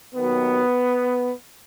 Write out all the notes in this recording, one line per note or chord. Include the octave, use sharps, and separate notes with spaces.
D#2 D#3 F#3 B3